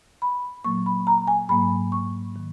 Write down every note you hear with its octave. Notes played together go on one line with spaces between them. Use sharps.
B5
A#2 F#3 A#3 C#6
B5
A#5
G#5
G#2 F#3 A#3 B5
C#6
D#3